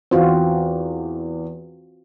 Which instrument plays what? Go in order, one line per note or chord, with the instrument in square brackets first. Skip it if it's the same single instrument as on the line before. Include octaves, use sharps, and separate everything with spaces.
[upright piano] E2 [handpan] C4 F4 F#4